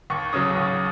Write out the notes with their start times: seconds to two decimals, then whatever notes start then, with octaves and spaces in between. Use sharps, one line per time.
0.10 D#2 C#6
0.33 C#3 F#3 D#6
0.56 D#2